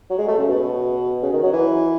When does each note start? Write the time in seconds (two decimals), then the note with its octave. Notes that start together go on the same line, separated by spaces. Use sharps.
0.10 F#3
0.19 G#3
0.28 A3
0.38 C#3
0.49 B2
1.22 C#3
1.32 D#3
1.43 F#3
1.53 E3